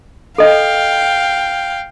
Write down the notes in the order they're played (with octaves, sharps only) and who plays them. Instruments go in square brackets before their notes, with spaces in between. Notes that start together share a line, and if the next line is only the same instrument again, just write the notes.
[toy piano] A4 D#5 [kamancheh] F5 G5